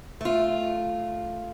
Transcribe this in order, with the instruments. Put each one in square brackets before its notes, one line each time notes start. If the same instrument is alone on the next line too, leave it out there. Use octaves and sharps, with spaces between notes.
[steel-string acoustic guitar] A3 F4